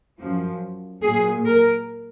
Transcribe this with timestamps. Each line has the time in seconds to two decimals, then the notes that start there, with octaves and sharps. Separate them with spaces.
0.19 F#2 F3
1.02 A#2 F#3 G#4
1.45 A#4